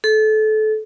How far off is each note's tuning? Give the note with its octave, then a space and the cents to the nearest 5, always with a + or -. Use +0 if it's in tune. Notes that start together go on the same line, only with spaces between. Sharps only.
A4 -25